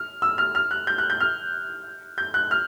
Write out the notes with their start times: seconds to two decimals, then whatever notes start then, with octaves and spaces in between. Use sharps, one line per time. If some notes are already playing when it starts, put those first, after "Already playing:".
Already playing: F6
0.22 E6
0.38 F6
0.55 F6
0.71 F#6
0.87 G6
0.98 F#6
1.10 G6
1.20 F6
2.18 G6
2.34 F#6
2.51 F6